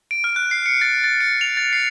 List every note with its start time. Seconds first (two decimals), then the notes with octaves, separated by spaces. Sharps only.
0.11 D7
0.24 F6
0.36 F#6
0.51 C7
0.66 C#7
0.81 A6
1.04 A6
1.20 C#7
1.41 F7
1.57 A6
1.73 C7